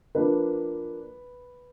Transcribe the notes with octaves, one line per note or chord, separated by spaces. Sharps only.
F3 A#3 D4 B4